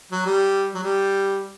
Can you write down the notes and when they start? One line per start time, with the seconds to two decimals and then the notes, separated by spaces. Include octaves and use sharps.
0.11 F#3
0.26 G3
0.74 F#3
0.83 G3